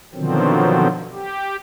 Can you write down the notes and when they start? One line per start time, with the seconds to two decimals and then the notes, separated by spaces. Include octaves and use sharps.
0.14 B2 D3 D#3 F3 F#3 C4
1.13 G4